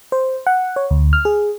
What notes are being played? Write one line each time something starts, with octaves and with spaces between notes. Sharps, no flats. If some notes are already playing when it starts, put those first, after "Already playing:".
C5
F#5
C#5
D2
F6
G#4